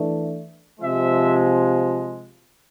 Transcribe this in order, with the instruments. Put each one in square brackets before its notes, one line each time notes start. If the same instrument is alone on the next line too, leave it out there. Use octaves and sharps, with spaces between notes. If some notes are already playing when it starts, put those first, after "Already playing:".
Already playing: [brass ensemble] E3 A3 D4
C3 F3 G#3 E5